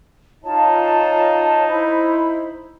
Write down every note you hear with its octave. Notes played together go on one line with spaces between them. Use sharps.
D#4 F4 C#5 A5
E4 C5 B5